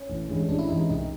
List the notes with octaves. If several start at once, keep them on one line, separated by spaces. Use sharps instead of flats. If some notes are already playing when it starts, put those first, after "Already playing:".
Already playing: C#4
A1
G2 E3 G#3
A1 D4
E4
G2 E3 G#3 D#4
C2 D#4